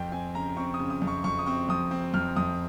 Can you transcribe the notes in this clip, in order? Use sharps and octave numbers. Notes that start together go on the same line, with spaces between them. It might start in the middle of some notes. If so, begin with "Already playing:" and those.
Already playing: F2 G5
C4 G#5
C#3 A#5
C4 C#6
D#6
C#3
D#6
F2
C#6
F2 C#6
D#6
C4 C#6
F2 D#6
C4
F2 F6
F2 D#6